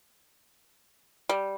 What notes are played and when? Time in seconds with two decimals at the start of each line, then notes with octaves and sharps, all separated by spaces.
1.29 G3